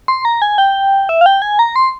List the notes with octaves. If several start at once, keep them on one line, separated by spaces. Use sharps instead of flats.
C6
A#5
G#5
G5
E5
F5
G5
G#5
A#5
C6